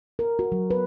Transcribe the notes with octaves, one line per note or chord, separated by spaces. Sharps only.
A#4
F#4
F#3
B4